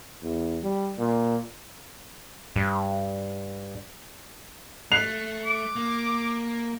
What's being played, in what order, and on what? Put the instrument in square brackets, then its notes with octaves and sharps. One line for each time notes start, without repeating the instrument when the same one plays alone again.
[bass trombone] E2
G3
A#2
[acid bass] G2
[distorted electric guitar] A3 [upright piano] F#6 C7 F7
[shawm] D6
[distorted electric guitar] A#3